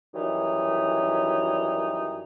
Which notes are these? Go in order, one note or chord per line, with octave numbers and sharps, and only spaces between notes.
F#2 D#3 E3 F#3 G3 D#4